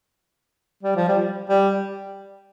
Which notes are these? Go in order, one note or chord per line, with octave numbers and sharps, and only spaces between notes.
G3
F3
G3
G3